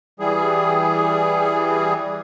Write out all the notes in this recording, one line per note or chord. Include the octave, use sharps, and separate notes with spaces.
E3 G3 G#4